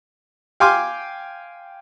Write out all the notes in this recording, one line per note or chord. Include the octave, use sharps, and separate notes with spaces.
F5 G5 G#5 C6 D6 F6